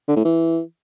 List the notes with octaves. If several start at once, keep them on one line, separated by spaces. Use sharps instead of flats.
D3
A2
E3